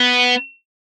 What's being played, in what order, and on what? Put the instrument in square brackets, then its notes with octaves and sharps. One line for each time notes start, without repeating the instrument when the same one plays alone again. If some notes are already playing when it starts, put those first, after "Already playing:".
Already playing: [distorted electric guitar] B3